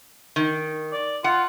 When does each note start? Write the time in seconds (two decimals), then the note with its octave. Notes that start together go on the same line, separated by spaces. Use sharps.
0.36 D#3
0.93 D5
1.24 F4 F#5